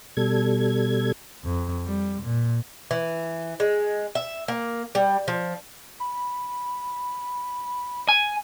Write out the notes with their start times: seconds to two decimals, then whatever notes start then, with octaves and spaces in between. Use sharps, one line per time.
0.17 B2 G3 A4 G#6
1.45 F2
1.86 G3
2.22 A#2
2.91 E3
3.60 G#3
4.15 E5
4.48 A#3
4.95 G3
5.28 F3
6.00 B5
8.09 G#5